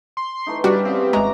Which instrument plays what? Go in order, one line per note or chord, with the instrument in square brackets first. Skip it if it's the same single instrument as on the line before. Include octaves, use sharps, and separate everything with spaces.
[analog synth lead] C6
[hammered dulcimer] E3 A3 D#4
[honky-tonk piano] G3 [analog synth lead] D4 [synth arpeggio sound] F#4 [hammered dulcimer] D5
[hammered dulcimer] C#3 B3 [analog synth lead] C4
[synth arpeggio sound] G#1 G#3 [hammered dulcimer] F#4 D5 E5 [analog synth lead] A#5